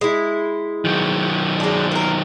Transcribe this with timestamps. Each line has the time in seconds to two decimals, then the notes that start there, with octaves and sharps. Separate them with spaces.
0.01 G#3 E4
0.85 D#3 F#3
1.60 G#3 D4
1.92 A#3 A#4